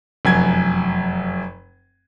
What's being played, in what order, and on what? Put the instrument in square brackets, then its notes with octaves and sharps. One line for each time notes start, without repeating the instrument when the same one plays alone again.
[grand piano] F1 F#2 G#6